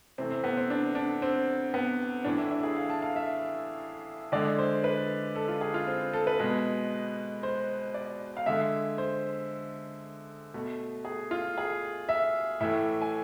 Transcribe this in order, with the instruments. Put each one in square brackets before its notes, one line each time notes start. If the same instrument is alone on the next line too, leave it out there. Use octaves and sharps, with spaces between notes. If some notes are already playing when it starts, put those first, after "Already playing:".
[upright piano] C3 E3 A3 C4
C4
B3
C4
D4
D4
C4
B3
A2 E3 A3 D4
E4
E4
G#4
F5
A5
F5
E5
D3 G#3 D5
C5
B4
A4
F4
G#4
F4
C4
A4
B4
B2 G#3
C5
D5
F5
D3 G#3 E5
C5
B2 A3
G#4
F4
G#4
E5
A2 E3 A3 E5
G#5